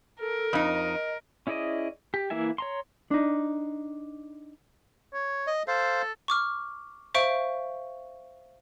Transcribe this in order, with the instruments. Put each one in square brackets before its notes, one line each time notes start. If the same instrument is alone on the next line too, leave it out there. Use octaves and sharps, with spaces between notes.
[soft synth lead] A4 [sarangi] A#4
[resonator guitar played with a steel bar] F2 D#4 [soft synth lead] D#5
[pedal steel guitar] C#4 E4 G#4 D5 D#5
G4
E3 A#3 E4 E5 G#5
C#5 A#5 C6
[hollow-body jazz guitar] D4 D#4
[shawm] C#5
[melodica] D#5
[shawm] A4 [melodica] C5 F5
[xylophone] C#6 D6 F6
C5 E5 F5 C#6 D7